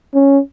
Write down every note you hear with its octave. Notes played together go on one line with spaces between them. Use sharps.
C#4